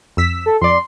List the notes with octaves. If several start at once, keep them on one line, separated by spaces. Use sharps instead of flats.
F2 E6 B6
A4
F2 D5 C6